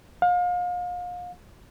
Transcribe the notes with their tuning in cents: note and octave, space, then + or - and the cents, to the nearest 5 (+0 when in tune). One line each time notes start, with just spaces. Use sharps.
F5 +35